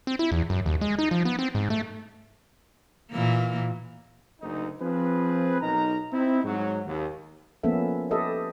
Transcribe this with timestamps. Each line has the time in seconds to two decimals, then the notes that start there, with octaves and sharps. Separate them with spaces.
0.07 C4
0.19 E4
0.32 E2
0.50 F#2
0.66 D#2
0.81 G#3
0.98 D#4
1.11 F3
1.25 B3
1.39 C4
1.55 G#2
1.70 A3
3.11 A#2 E3 A#3
4.40 F#1 D2 D#4
4.80 F3 C4 G#4 B4
5.61 B1 D#4 A#4 A#5
6.12 C4 D#4 E4
6.45 G#2 F#3
6.86 D#2
7.63 F3 A#3 B3 C#4 A4 E5
8.11 G4 A4 B4 D#5 E5